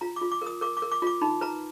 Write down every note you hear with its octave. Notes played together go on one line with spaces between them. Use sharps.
F4 A#5
D6
F4
D6
A#4 D#6
A#4 D6
D6
A#4
D6
F4 D6
D#4 B5
B4 A#5